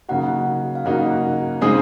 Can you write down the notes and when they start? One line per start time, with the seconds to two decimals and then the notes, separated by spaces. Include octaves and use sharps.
0.08 C#3 F#3 A#3 D#4 F#4 F#5
0.75 F5
0.85 C#3 F#3 A#3 D#4 F#4 F#5
1.61 C#3 G#3 C4 D#4 G#4 D#6